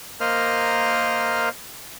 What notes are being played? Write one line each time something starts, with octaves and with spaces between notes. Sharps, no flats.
A#3 A#4 C5 D#5 F6